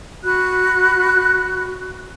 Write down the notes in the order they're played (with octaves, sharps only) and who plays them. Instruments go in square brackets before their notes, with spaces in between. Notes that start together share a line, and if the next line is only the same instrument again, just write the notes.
[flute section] F#4 B5 F#6